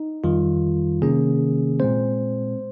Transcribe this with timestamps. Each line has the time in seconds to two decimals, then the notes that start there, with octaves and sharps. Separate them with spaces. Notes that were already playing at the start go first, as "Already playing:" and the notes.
Already playing: D#4
0.24 F2 D#3 G3 F4
1.02 C3 D#3 A#3 C#4 G#4
1.80 A#2 G#3 C4 C5